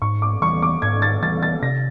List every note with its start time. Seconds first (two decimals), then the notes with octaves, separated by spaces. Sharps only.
0.02 G#2 C#6
0.22 D6
0.42 E3 G3 B3 C#6
0.62 D6
0.82 G#2 G#6
1.02 A6
1.22 E3 G3 B3 A6
1.43 A6
1.62 C3 A#6